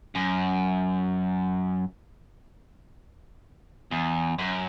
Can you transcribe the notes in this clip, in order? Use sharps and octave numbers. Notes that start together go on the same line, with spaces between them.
F#2
E2
F#2